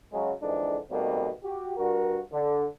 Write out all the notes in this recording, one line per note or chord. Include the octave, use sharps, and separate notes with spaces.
C#3 F#3 G#3
F2 D3 E3 G#3 D4 D#4
B2 D#3 G3 A3 A#3 C4
F#4 G4
G2 F#4 A#4
D3